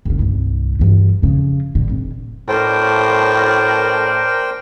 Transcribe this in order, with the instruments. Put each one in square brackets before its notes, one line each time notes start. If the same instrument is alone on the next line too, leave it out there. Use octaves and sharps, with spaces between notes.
[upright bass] F#1 C#3
C2 G2
G2 E3
F2 C#3
A2 D3
F1
[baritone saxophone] A2 [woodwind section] C#4 D4 A#4 [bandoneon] C5 G5